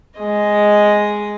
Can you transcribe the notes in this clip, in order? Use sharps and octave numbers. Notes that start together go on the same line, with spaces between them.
G#3 D#5